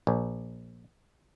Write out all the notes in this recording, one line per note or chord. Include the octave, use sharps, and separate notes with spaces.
A#1